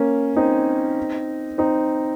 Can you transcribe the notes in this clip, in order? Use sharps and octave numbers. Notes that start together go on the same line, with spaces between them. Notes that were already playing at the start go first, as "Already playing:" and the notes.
Already playing: A#3 C#4
C4 D#4
C4 D#4